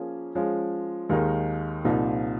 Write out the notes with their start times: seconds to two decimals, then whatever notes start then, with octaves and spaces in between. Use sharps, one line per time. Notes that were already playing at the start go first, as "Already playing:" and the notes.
Already playing: F3 A#3 C#4 G#4
0.35 F3 G#3 C#4
1.09 D#2 D#3 G#3 D#4 A#4
1.85 C2 A#2 F3 A#3 D#4